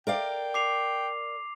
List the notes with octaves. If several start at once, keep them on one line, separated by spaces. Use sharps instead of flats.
A#4 D5 F5 G5
D6 C7 F7